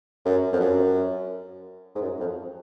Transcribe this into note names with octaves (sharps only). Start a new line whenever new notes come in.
F#2
F2
F#2
G#2
F#2
F2